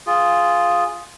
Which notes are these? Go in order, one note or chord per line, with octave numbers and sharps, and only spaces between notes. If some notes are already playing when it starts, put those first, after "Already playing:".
F4 G#4